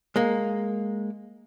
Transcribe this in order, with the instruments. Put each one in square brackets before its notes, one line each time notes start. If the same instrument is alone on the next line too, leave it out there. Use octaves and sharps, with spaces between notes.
[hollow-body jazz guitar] G#3 A#3